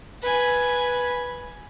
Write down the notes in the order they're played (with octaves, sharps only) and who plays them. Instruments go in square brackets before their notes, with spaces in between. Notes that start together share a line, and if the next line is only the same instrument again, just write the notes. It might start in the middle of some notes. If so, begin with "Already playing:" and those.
[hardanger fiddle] B4 G#5